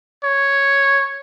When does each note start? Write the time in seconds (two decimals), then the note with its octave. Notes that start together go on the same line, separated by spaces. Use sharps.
0.24 C#5